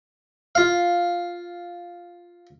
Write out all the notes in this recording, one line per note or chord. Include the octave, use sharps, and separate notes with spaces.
F4 F5